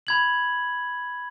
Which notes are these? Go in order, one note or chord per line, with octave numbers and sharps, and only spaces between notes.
B5 G#6 F#7